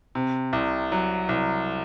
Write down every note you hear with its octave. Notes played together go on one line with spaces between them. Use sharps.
C3
C2
F#3
C2